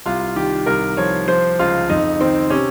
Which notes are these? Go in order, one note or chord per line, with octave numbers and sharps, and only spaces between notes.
C2 F4
D#3 G4
C2 A#4
F3 C#5
F3 C5
C#2 F4
F2 D#4
D#3 C4
C3 C#4